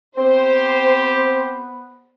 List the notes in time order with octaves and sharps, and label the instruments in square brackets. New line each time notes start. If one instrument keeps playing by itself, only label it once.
[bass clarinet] B3 [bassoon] C4 [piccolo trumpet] G4 [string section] C5